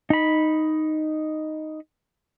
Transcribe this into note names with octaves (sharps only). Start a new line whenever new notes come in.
D#4 B5